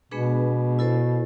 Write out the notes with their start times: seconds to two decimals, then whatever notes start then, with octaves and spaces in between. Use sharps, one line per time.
0.11 B2 G#3 B3 D4 G#4 B4
0.79 E4 A4 C5